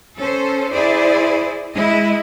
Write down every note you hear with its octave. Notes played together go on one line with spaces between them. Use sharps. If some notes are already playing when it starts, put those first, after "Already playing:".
C#4 A4 C5
E4 G#4 C5 D5
G#3 E4 D#5